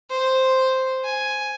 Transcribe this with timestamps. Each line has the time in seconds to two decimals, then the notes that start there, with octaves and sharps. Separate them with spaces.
0.10 C5
1.04 G#5